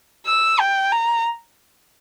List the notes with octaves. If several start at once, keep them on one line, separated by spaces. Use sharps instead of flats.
E6
G5
A#5